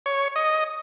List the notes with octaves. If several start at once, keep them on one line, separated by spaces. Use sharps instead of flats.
C#5
D#5